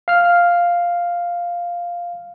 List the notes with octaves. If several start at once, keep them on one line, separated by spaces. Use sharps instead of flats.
F5 F6